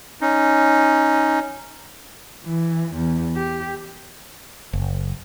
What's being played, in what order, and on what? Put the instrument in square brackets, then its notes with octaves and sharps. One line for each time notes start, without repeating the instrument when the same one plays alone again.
[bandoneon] C#4 D#4
[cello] E3
E2
G4
[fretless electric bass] F#1